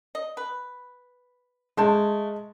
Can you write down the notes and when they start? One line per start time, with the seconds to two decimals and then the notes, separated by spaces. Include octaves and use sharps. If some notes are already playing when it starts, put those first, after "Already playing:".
0.15 D#5
0.37 B4
1.77 G#3 A3 C5 A5